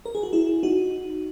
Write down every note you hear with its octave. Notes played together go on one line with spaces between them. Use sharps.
A#4
G#4
F#4
E4 G#4
D#4 F#4